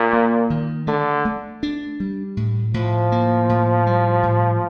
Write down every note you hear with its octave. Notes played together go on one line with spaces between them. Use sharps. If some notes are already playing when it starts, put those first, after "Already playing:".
Already playing: A#2
A#3
D#3
D3 A3
A3
D4
G3
A2
A2 F3
A#3
A2
G3
A2